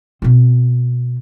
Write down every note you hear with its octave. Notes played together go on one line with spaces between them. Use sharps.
B2 C4